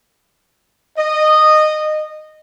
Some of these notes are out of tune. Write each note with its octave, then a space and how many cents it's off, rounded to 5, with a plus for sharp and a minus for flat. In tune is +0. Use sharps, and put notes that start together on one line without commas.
D#5 -15